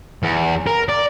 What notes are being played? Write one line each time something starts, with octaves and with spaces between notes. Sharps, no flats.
E2
A#4
D5